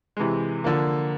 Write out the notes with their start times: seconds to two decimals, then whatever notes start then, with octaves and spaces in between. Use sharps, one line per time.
0.17 C3 E3 G#3
0.64 D3 F3 A#3